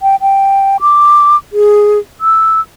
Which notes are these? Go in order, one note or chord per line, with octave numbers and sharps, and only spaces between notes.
G5
G5
D6
G#4
E6